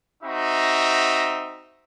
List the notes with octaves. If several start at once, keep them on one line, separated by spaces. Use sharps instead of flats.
C4 D#4 F#4 E5 A#5